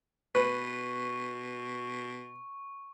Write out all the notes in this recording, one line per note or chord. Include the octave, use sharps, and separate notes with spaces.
B2 B4 C#6